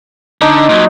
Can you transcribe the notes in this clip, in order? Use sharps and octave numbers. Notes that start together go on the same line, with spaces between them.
D3 D#4
A#2 F#3